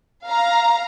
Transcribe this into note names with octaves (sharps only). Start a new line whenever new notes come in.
F5 A#5